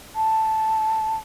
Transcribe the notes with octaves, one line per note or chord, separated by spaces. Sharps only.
A5